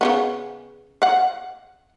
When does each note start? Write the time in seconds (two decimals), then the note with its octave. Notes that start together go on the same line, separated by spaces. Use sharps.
0.01 C#3 E3 B3
1.02 F5 F#5